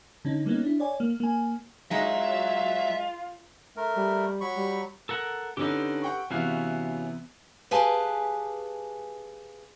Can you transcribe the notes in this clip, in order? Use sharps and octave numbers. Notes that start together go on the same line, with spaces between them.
D3 C#4 D#4
G3 A#3 B3 C#4 D#4
D4 E4
C#5 D5 G#5
A#3
A#3 G#5
F#3 G#3 D#4 F4 E5
A3 A#4
G3
F#3 B5 C#6
G3
A4 A#4 F#5
D3 C#4 D#4 G4 A4 B4
F#5 G5 C#6
C3 E3 B3 C#4 F#4 F5
G4 G#4 B4 F5 G#5 A5